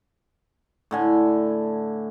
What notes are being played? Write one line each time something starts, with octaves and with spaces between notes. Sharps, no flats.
A2 D3 G#5